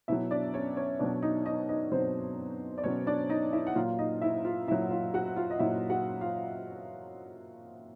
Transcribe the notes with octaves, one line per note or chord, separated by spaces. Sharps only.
B2 F#3 E4 E5
D4 D5
C#4 C#5
C#4 C#5
B2 F#3 D4 D5
D#4 D#5
D#4 D#5
D#4 D#5
B2 F#3 C4 C5
D5
B2 F#3 C#4 C#5
D4 D5
D#4 D#5
E4 E5
F#5
A#2 F#3 F4 F5
D#4 D#5
E4 E5
F4 F5
A#2 F#3 E4 E5
F#5
F4 F5
F#4 F#5
F4 F5
D#5
A#2 F#3 E4 E5
F#4 F#5
F4 F5